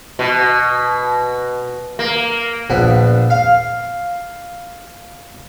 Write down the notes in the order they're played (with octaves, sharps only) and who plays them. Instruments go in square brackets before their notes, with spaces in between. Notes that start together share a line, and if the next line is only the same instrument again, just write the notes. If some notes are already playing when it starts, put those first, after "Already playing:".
[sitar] B2
A#3
[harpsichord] A#1 B3 D4
F5